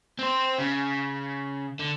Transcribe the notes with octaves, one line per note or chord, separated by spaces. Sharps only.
C4 C5
C#3
D3